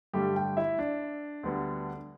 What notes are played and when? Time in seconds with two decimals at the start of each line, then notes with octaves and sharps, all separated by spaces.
0.13 G2 D3 G3 A3 G4
0.36 G4 G5
0.57 E4 E5
0.79 D4
1.43 D2 D3 G3 B3